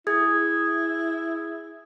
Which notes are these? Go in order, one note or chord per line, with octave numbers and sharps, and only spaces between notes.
E4 G#4 D#6 G#6